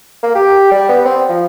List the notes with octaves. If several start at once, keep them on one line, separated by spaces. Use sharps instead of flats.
A#3
G4
G3
B3
C4
F3